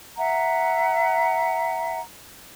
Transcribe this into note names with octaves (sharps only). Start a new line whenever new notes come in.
E5 F#5 A#5